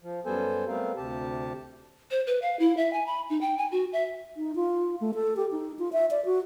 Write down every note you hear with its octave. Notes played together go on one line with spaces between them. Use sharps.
F3
F#2 G3 B3 A4 C5 G#5
G3 A3 B3 C4 A#4 F5
D2 C3 G4 A5
C5
B4
F5
E4
E5
G#5
B5
D#4
G5
G#5
F#4
E5
D#4
F4
A3
A4
G4
D#4
F4
E5
D5
F#4